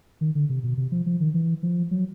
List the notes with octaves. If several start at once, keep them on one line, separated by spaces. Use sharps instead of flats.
D#3
D3
C3
B2
C3
F3
F3
D#3
E3
F3
F#3